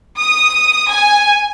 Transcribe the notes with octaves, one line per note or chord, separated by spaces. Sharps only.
D#6
G#5